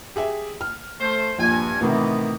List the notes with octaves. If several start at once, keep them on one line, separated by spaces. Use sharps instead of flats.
G4 G#4 E5
F6
A3 C5
A#1 G2 G#5
A2 C3 D#3 E3 B3